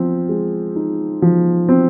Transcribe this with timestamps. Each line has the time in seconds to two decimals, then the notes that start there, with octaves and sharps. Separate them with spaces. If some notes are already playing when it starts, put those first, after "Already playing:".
Already playing: F3 C4
0.29 G#3
0.76 D#4
1.22 F3
1.69 C4